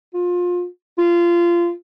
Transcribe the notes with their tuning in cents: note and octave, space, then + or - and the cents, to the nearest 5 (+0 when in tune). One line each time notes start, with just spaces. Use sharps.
F4 +25
F4 -20